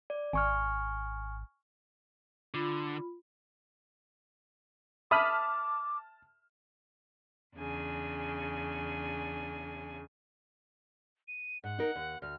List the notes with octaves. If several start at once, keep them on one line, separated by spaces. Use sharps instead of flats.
D5
G#1 G#5 C#6 F6
D3 F4 B5
E5 A5 B5 D6 D#6 F6
E2 C#3 D4 G#5
D#7
G#2 F#5
D#4 A#4
D#2
D2 F6